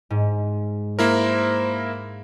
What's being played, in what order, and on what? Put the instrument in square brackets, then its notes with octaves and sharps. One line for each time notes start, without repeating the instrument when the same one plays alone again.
[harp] G#2
[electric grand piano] A#3 E4 A#4 [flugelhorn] C5